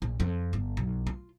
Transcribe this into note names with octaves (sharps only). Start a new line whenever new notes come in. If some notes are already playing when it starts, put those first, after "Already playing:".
A#1
F2
G1
B1
F4